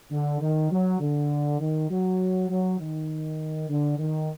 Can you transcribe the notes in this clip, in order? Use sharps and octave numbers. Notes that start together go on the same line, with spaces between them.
D3
D#3
F#3
D3
D#3
F#3
F#3
D#3
D3
D#3